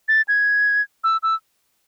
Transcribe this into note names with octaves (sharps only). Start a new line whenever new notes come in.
A6
G#6
E6
E6